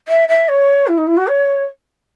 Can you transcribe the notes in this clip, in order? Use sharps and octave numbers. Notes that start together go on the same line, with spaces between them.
E5
E5
C#5
E4
D#4
E4
F#4
C#5